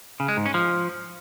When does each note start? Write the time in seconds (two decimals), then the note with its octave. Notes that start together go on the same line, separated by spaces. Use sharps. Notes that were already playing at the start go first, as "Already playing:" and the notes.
0.20 C#3
0.28 G#3
0.37 G#2
0.46 C#4
0.54 F3